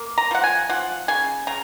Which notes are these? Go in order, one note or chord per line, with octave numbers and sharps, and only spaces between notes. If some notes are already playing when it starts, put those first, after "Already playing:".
Already playing: A#3
A#5
F3 F#5
G#5
F3 F#5
C#3 G#5
C#3 A#5